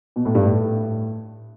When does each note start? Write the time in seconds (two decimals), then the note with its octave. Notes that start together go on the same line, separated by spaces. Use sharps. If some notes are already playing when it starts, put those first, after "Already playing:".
0.16 B2
0.25 A2
0.35 G2
0.44 A2